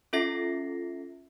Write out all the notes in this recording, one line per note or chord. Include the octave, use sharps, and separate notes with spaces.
C#4 F4 A4 E5 A#6 C7